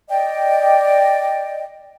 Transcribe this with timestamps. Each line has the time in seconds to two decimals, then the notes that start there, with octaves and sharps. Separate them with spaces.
0.08 D5 D#5 G5